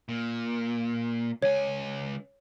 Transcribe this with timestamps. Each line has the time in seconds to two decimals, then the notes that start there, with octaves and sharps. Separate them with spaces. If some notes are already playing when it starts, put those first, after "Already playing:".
0.09 A#2
1.42 C#2 C#5 G#5